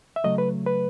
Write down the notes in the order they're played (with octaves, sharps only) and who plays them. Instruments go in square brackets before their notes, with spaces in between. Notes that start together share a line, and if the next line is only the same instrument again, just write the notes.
[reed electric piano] E5
C#3 F#3 A3 D#5
B4
B4